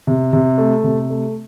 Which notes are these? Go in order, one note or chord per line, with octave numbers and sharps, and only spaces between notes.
C3
C3
A3
C3
A3